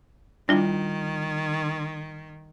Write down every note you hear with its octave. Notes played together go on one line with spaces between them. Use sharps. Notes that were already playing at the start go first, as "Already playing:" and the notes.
D#3 G3 D4 E4 F4